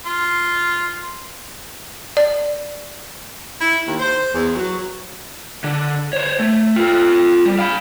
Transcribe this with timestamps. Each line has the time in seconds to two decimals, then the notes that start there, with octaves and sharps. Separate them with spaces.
0.06 F4
2.17 D5
3.60 E4
3.86 D#2
4.00 C5
4.33 E2
4.55 F#3
5.64 D3
6.13 C5 C#5
6.40 A3
6.76 F4 A4
7.46 G3
7.59 F5 B5